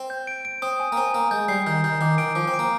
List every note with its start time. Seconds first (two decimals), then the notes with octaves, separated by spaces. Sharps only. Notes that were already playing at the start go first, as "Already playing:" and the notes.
Already playing: C4
0.10 G6
0.27 D7
0.45 D7
0.62 C4 D#6
0.80 G#5
0.92 A#3
0.96 C4 G#5
1.14 A#3 G#5
1.31 G#3 G6
1.48 G3 C7
1.67 D#3 G6
1.84 D#3 G6
2.01 D#3 D6
2.18 D#3 D7
2.35 F3 D6
2.48 C4
2.54 D7
2.59 A#3